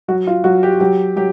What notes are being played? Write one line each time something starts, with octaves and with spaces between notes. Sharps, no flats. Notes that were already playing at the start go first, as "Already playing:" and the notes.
F#3 F#4
F4
F#3 F#4
G4
F#3 G4
F#3 G4